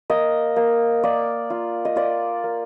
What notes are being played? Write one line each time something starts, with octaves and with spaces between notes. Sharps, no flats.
A#3 D#5
A#3
A#3 D5
F4
D#5
F4 D5
A#3